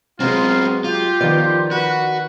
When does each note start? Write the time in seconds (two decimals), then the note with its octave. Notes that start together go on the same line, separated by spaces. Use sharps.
0.20 F#3 G#3 B3 C4 F4
0.84 F4 G4
1.21 D#3 F3 B3 D5
1.71 F#4 B4 F#6